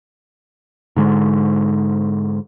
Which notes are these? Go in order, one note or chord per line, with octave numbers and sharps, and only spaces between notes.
G#2 D3 G#3